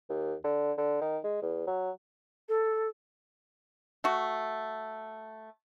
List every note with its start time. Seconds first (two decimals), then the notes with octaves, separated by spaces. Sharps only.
0.10 D#2
0.44 D3
0.77 D3
1.01 D#3
1.24 G#3
1.42 E2
1.67 F#3
2.49 A4
4.04 A3 F#4